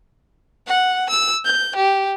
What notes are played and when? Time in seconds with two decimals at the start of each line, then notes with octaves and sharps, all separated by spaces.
0.67 F#5
1.10 E6
1.45 G6
1.76 G4